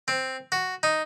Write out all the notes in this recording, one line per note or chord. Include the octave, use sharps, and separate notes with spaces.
C4
F#4
D#4